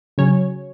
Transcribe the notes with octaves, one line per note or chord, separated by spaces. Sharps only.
C#3 F#3 C#4 C#5